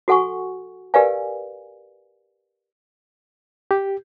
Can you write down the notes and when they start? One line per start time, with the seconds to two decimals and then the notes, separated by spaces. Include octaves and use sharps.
0.08 F#4 A4 F#5 G#5 C#6
0.94 G4 A#4 B4 D5 F5 G#5
3.71 G4